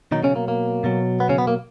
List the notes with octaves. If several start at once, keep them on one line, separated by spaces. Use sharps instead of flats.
B2 D#3 F#3 D#4
C#3 C#4
A#3
A#3
B2 F#3
B3
C#3 C#4
B3
A#3